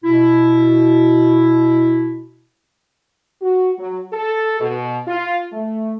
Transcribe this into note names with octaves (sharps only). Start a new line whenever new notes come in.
B2 E4
F#4
F#3
A4
B2
F4
A3